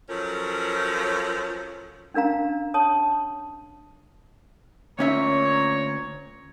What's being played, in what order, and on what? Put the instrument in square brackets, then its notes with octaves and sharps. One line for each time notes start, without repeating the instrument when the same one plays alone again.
[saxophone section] F3 F#3 C#4 A4 A#4
[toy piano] C#4 D4 A#4 F5 A#5
C#5 A5 D#6
[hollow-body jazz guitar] D2 C#4 E5 [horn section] A#2 C#5 A#5